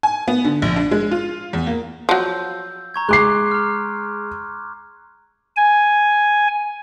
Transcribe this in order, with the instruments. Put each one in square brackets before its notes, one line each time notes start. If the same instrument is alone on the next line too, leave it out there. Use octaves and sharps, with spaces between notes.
[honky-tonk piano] G#5
B3
D3
A#1
D4
G#3
F4
E2
A#3
[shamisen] F3 F#3 [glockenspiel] E6 G6
[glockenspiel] A#5 C#6 G#6
[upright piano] G#3 D6 C7 [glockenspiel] C6 F#6
[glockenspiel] A#5 F6
[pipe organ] G#5